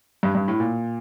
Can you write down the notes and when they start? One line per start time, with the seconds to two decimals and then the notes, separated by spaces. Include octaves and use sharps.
0.23 G2
0.35 G2
0.48 A2
0.60 A#2